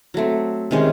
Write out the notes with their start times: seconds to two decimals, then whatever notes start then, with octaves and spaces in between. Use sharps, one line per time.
0.14 F#3 A3 C4
0.71 C3 D#3 G#3 C#4